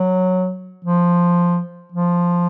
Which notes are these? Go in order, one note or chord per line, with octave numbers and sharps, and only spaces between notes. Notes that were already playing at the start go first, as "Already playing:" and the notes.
Already playing: F#3
F3
F3